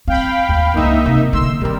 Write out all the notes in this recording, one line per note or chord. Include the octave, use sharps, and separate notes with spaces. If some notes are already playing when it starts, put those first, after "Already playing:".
C4 F5 G5 B5
D#2
C#2 A#3 D4 D#4 E5
C3
D3 A#3 C6 E6
D#3 G3 C4 A#4